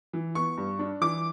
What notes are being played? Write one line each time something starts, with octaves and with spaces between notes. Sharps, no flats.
E3
B3 C#6
G2
D4
E3 D6